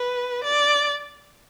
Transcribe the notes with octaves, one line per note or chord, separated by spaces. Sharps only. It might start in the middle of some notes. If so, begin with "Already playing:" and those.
Already playing: B4
D5